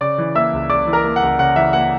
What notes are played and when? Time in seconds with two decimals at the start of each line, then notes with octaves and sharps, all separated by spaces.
0.01 C#3 D5 D6
0.18 E3
0.35 A#3 E5 E6
0.53 C#2
0.70 C#3 D5 D6
0.87 E3
0.93 A#4 A#5
1.04 A#3
1.16 F#5
1.22 C#2
1.39 C#3 F#5
1.56 E3 E5
1.73 A#3 F#5